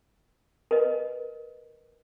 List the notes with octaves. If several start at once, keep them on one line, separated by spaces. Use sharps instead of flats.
A#4 B4 D#5